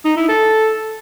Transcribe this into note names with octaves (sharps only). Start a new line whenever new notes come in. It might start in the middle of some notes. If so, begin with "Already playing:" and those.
D#4
E4
A4